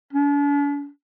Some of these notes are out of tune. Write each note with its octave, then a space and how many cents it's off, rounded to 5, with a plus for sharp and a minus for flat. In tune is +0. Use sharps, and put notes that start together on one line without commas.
D4 -45